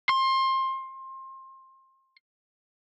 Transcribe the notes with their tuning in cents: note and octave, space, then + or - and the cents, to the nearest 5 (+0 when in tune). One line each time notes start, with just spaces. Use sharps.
C6 +25